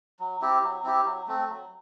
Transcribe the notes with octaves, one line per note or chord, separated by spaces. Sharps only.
F#3
C4 E4 G4
F#3
C4 E4 G4
F#3
A3 C4
F#3